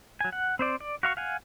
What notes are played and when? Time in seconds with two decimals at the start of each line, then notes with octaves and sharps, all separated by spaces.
0.21 F#3 G#5
0.32 F#5
0.59 C4 C5 D5
0.80 D5
1.03 F#4 F5 C#6
1.17 F5 F#5 G#5